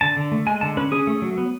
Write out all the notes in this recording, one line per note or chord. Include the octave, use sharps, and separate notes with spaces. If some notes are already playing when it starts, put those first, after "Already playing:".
D3 A5
D3
A3
G#3 G#5
D3 A5
C#4 B4
C#4 G#4
A3
F#3
B3